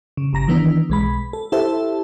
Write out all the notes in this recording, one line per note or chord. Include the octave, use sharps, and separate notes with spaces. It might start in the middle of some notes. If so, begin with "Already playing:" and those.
C#3
G1 C#3 A#5 A#6
D#3 E3 B3 D4
B1 G#3 B5
A4
E4 G4 A4 C5 E5 A5